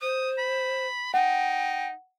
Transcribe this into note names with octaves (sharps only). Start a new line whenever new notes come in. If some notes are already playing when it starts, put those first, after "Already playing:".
C5 D#6
B5
D#4 F#5 G5